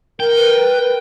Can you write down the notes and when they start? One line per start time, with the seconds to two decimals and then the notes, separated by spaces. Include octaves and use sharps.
0.20 A#4 G5
0.37 B4